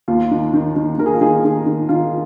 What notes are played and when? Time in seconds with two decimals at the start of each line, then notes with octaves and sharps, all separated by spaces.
0.08 D#2 F4
0.31 D#3
0.53 D#3
0.76 D#3
0.98 D#3 A#4
1.06 G#4
1.14 F4
1.21 D#3 G#4
1.44 D#3 G#4
1.66 D#3
1.89 D#3 F4